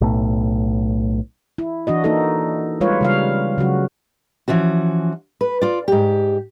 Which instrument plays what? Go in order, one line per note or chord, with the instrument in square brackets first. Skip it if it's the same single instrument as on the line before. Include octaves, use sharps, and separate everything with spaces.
[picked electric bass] B1 A2
[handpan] E4
E3 D4 F#4 D#5
A#3 D#4 F#4 A4
G3 G#3 F4 B4 C#5 F5
C#3 G3 F5
C#3 F#3 F#4
[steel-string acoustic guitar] E3 F3 C#4 F#4
B4
F4 D5
G#2 G4